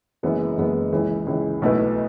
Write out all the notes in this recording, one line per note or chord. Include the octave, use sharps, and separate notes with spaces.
F#1 F#2 E3 G#3 B3
F#1 F#2 E3 G#3 B3
C#2 C#3 E3
C#2 C#3 E3
B1 B2 A3 E4 B4